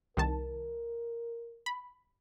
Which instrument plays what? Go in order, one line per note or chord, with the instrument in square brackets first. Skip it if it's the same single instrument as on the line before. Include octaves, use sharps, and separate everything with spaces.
[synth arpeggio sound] C2 D#3 A5 [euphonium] A#4
[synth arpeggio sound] B5